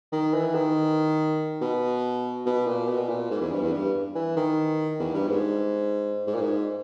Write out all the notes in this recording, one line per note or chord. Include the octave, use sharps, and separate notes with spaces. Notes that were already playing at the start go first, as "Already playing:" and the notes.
D#3
E3
D#3
B2
B2
A#2
B2
A#2
G#2
E2
G2
E2
G2
E3
D#3
E2
G2
G#2
G#2
A#2
G#2